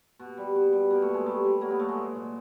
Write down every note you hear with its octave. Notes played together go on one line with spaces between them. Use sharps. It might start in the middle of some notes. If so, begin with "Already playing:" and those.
B2
G3
B2
G3
B2 A#3
A3
B2
G#3
G3 A3
G3
F#3 A#3
B3
F#3 A3
G#3
A#2
A#2